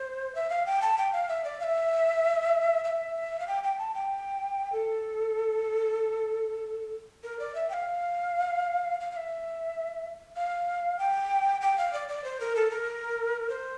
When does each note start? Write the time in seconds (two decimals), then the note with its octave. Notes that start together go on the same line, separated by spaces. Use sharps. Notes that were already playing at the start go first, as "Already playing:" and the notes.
Already playing: C5
0.35 E5
0.50 F5
0.66 G5
0.81 A5
0.98 G5
1.13 F5
1.28 E5
1.44 D5
1.60 F5
1.63 E5
2.84 E5
3.40 F5
3.47 G5
3.63 G5
3.79 A5
3.94 G5
4.72 A4
7.23 A#4
7.39 D5
7.55 E5
7.70 G5
7.73 F5
9.00 F5
9.11 F5
9.16 E5
10.36 F5
10.99 G5
11.61 G5
11.78 F5
11.93 D5
12.08 D5
12.24 C5
12.40 A#4
12.56 A4
12.71 A#4
13.49 C5